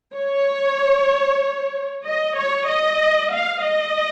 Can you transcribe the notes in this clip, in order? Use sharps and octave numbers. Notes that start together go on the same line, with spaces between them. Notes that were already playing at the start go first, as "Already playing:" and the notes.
C#5
D#5
C#5
D#5
F5
D#5